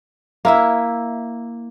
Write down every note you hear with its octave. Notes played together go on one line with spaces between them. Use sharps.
A#3 E4 E5